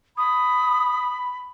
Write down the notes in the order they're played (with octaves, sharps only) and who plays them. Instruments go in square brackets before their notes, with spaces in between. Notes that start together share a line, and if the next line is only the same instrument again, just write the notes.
[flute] B5 [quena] D#6